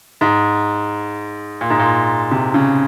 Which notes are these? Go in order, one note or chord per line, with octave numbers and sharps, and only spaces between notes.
G#2
A#2
G#2
A#2
C3
C#3